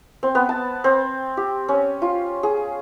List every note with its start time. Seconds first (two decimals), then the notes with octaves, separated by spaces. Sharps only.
0.23 C4
0.35 B3
0.49 A5
0.84 C4
1.37 G4
1.68 C#4
2.02 F4
2.43 G#4